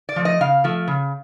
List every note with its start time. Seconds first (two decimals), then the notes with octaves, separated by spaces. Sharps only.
0.09 D5
0.16 F3 A3
0.25 D#5
0.41 C#3 F5
0.64 F3 A3
0.88 C#3